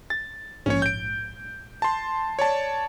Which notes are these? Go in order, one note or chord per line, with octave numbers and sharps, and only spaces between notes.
A6
A#1 G#2 C#4 C#5
G6 D7
A5 C6
C#5 D5 A5